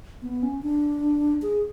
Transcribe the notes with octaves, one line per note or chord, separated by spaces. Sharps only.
B3
C#4
D4
G#4